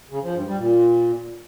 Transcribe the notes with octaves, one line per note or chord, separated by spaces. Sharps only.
C#3
F3
G2
G3
A#2